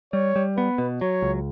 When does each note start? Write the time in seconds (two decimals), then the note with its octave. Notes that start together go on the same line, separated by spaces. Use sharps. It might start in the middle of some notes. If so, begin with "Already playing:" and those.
0.13 G3 C#5
0.36 G3
0.57 B3 B4
0.78 B2
1.01 F#3 C#5
1.22 C#2